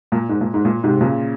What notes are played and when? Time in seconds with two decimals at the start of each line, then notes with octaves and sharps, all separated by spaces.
0.12 A#2
0.29 G#2
0.41 A#2
0.54 G#2
0.65 A#2
0.83 G#2 C3
1.01 A#2 C#3